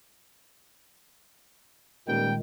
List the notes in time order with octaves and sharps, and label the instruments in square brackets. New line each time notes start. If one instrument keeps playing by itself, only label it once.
[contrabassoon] D#1 [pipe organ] A#2 D#3 G#3 [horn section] G3 A#4 G5